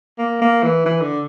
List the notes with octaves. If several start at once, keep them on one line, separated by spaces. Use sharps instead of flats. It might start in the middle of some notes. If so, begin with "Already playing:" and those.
A#3
A#3
E3
E3
D3